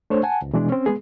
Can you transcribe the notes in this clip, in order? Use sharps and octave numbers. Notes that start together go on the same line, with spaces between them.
A3 D4 C5 C#5
F#5 G#5 A5
C#2
B2 E3 G#3 D4
C4 C#4
G#3 B3 G#4